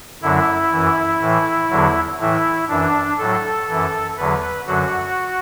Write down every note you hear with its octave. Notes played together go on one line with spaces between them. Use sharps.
F#2 D3 F#3 E4
F#2 E3
A2 E3
E2 D3 F#3
A2 E3 E4
F#2 E3 D4
A2 F#3 A4
F#2 E3
E2 D3 F#3 B4
F#2 D3 F#3 F#4